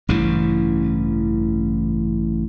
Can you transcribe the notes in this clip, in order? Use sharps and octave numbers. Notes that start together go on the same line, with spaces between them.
A1 G2 C#3 E3